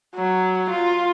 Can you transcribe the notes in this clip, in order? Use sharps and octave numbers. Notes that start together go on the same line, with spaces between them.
F#3
F4